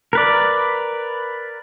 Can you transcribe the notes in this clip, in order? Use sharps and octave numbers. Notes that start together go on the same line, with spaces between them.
A#4 B4 D5